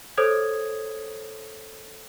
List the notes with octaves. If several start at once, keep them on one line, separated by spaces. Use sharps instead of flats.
A4 C5 C#5 D#6 G#6